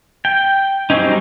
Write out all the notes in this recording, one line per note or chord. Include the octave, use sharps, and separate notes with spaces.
G5
F#3 G3 C4 C#4 D#4